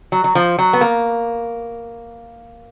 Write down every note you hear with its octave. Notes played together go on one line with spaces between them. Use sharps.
F#3
F#3
F3
F#3
B3
A#3